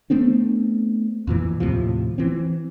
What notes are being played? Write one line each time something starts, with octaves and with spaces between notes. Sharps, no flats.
A3 B3 C4 D4
F2 A#2 E3
D#2 A2 C3 F3
E3 C4